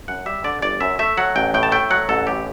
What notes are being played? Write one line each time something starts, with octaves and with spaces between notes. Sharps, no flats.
F#2 F#5
G3 E5
D3 D5
G1 D5
F#2 E5
A3 E5
F#3 F#5
A1 G5
A2 G5
A5
A3 G5
F#3 F#5
A1 A4
A2 G4